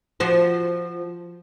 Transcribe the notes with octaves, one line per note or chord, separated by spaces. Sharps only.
F3 F#4 C5